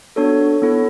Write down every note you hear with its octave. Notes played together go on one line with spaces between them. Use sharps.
B3 D4 F#4 A4 C#5
B3 E4 A4